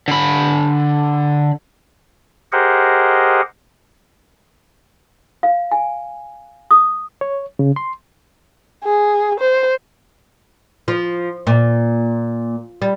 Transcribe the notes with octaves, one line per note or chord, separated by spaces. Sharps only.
D3 B5
G4 G#4 A#4 C5 D#5 F#5
F5
G#5
D#6
C#5
C#3
C6
G#4
C5
F3
A#2
G3